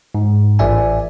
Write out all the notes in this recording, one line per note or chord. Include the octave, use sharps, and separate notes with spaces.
G#2
A1 D5 E5 G#5